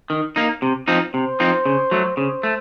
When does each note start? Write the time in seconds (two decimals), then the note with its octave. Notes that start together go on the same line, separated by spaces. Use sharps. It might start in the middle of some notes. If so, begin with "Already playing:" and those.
0.10 D#3
0.36 A#3 D#4
0.62 C3
0.88 F3 C4 D#4
1.14 C3 C5
1.40 F3 C4 D#4
1.65 C#3
1.91 F#3 A3
2.17 C#3 C5
2.43 A3